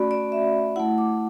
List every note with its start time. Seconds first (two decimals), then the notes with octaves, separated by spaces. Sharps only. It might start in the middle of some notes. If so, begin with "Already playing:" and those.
Already playing: A3 C#4 F#4 D5 B5
0.11 D5
0.32 E5
0.76 A3 E4 F#5
0.98 D6